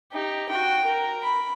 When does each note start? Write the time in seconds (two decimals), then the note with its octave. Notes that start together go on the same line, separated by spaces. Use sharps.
0.12 D#4 G4
0.50 F#4 G5
0.86 A#4
1.23 B5